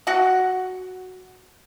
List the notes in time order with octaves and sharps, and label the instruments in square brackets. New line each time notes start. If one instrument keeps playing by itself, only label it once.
[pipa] F#4 F#5